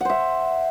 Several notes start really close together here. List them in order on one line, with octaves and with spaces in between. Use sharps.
F#5 C5 E5